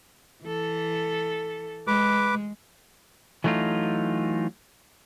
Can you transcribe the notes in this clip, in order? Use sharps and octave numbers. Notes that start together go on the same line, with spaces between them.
E3 A4
G#3 B4 D6
E3 F#3 A3 D#4 F4